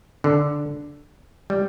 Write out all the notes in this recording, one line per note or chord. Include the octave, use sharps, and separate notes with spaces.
D3
G3